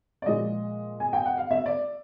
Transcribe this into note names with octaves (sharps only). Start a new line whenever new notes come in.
D5
A#2 F3 G#3 D#5
G#5
G5
F#5
F5
E5
D5